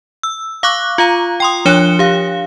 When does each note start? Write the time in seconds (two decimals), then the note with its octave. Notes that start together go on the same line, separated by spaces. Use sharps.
0.23 E6
0.63 F5 C#6 D6 F#6
0.98 F4 F5 A#5
1.40 G5 C6 D#6
1.65 F3 D4 C#5 F#6 C#7 G7
1.99 G4 F5